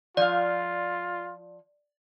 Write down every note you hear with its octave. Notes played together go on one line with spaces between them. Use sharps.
F3 F4 D5 F5